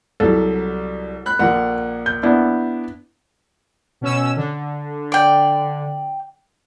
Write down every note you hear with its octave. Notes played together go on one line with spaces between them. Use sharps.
C2 F#3 A4
B5 F#6
A#1 A#3 F#5
G6
B3 D4 E4
B2 C#4 E6
D3
D5 G5